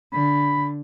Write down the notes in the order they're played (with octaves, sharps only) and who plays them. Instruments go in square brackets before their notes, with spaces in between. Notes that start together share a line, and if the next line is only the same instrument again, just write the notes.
[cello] D3 [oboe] B5